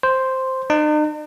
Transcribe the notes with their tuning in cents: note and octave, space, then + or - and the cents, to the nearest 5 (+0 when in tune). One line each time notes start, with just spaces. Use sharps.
C5 +0
D#4 -45